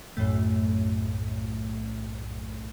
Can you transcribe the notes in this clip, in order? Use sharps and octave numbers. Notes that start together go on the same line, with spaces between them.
B1 F#2 A2 A3